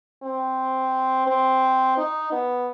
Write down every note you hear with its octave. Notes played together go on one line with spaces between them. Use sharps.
C4
C4
D#4
B3